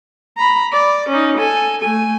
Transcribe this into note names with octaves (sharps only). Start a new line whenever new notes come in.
A#5 B5
D5
C#4 D#4
A4 G#5
A3 G#5